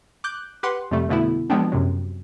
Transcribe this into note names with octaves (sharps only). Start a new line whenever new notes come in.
D6 F#6 G6
G4 B4 F#5 C6
F2 C3 G3 A3
B2 D3 A3 B3 E4
F3 F#3 G#3 B3 C4 D4
F#2 C3 F#3